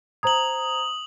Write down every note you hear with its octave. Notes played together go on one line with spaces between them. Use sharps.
C5 A#5 D#6 G#6 F#7